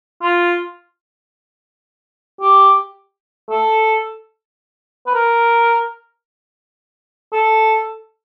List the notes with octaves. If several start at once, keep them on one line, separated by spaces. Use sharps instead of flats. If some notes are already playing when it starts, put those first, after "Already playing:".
F4
G4
A4
B4
A#4
A4